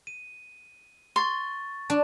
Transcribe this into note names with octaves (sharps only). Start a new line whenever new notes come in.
D#7
C6 C#6 A6
D4 A5